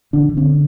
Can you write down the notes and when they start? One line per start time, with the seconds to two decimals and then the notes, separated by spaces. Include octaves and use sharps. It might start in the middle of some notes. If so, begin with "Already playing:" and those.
0.13 D3 D4
0.29 D3
0.37 C4